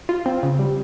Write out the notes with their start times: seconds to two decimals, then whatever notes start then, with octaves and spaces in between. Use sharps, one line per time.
0.09 F4
0.26 C4
0.43 C#3
0.59 G3